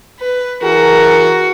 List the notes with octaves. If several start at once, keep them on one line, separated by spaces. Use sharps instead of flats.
B4
E3 F#4 G#4 A#4